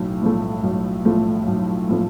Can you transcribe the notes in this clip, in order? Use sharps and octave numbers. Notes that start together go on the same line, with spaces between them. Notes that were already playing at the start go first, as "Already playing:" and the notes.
Already playing: B1 A2 A3
A2 F3 A3
B1
A2 F3 A3
B1
A2 F3 A3